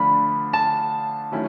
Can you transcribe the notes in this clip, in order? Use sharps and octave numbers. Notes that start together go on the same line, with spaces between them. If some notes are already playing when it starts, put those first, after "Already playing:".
Already playing: D3 F3 A3 D4 F4 B5
A5
D#3 F#3 A3 C#4 E4